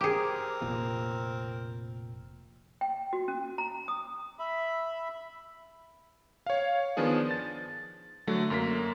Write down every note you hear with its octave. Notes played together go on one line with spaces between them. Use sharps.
C4 G4 G#4 A#4
F1 A#2 F3
G5
F#4
C#4
A#5
D#6
E5 B5
C#5 F5
D#3 F3 B3 D4 G#4
A6
D3 F#3 A3
F#2 A#3 B6